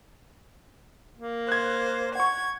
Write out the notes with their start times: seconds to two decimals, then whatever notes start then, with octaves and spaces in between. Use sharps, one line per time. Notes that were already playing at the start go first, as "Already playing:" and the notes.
1.17 A#3
1.49 C5 F#6 G#6
2.15 F#5 C#6 G#6